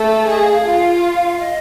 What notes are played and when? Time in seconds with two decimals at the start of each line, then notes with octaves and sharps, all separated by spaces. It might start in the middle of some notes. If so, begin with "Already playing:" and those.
Already playing: A3 A4
0.29 G#4 D#5
0.41 F5
0.53 F5
0.66 F4
1.40 D#5